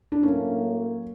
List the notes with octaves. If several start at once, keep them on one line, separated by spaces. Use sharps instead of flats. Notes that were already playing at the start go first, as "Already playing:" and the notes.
D4
A2 F#3 A#3 C#4